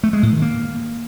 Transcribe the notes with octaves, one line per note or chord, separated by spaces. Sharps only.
A3
G#3
A2
D#3
A#3